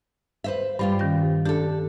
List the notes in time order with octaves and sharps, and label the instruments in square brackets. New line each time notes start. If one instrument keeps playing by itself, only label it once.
[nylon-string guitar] B4 C5 E5
[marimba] G2 C5 [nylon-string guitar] G3 F4 G4
[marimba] D#3 C#4 A#6
[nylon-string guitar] D4 A4 [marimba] G4